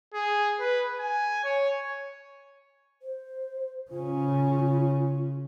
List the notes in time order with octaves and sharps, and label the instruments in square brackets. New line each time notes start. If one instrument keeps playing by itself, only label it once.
[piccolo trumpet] G#4
B4
G#5
C#5
[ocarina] C5
[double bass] C#3 C#4 [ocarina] F4